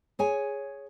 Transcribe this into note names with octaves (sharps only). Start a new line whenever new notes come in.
G#4 C#5 G#5